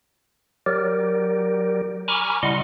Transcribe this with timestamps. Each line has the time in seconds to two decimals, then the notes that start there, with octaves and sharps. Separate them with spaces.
0.66 F#3 G4 A#4 D5
2.08 G#5 A#5 B5 C#6 D6 F6
2.43 C#3 G3 E4 D#5 F#5 C6